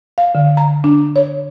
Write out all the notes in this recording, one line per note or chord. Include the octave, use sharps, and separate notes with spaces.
F5
D3
A#5
D4
C#5